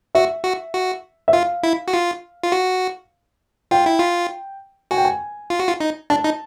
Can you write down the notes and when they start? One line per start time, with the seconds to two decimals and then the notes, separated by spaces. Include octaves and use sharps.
0.15 F#4 E5
0.44 F#4
0.74 F#4
1.28 E5
1.33 F4 F5
1.63 E4
1.88 F#4
1.94 F4
2.43 F4
2.52 F#4
3.71 F4 G5
3.86 E4
3.99 F4
4.91 F#4 G#5
4.97 G5
5.05 G#5
5.50 F4
5.59 F#4
5.68 F4
5.80 D#4
6.10 D4 A5
6.24 D#4